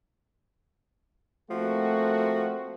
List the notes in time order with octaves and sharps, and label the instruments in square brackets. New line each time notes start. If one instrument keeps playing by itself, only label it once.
[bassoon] F3 [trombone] A3 [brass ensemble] A#3 C4 F#4